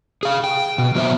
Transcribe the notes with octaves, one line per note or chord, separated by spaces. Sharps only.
G#4 F5
G5
B2
F3 F#3 B3 C5 E5